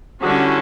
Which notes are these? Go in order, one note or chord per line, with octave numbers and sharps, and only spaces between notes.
D3 G3 C#4 E4 F#4